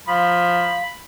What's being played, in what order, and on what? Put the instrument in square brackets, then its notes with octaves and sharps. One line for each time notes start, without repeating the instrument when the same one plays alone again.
[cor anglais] F3 [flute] F5 [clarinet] B5